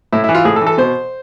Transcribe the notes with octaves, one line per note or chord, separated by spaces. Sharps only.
A2 E4
E4
E3
F4
A2 G#4
A4
E3
A4
B2 C5